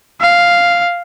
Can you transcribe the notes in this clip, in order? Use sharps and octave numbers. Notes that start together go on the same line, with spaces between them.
F5